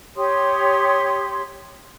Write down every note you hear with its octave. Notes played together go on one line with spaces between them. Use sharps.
G4 C#5 C6 D#6